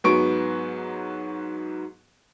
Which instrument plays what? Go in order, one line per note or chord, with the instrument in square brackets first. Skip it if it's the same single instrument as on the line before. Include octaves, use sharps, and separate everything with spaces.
[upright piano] G#2 F#3 B3 C#6 D7